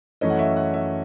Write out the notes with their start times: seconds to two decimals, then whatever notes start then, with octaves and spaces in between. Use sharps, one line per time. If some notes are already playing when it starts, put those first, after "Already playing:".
0.21 F#2 E3 A3 C#4 D#5
0.30 F#5
0.39 E5
0.56 F#5
0.74 E5